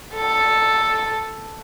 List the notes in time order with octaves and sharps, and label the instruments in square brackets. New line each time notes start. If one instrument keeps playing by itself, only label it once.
[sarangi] A4